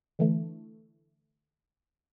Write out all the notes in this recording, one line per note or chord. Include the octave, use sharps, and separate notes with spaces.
D3 E3 A3